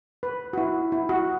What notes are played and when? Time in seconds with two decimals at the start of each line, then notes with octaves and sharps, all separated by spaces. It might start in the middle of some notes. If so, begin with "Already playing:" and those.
0.23 B4
0.53 F#4
0.58 E4
0.92 E4
1.09 F#4